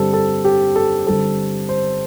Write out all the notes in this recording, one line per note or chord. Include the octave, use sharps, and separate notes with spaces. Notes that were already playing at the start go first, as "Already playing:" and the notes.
Already playing: G2 D3 G3 C4 A4
A4
G4
A4
G1 G2 G3 C4 A4
C5